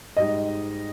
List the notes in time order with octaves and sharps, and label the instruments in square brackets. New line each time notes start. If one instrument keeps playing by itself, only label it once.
[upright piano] G#2 G3 D#5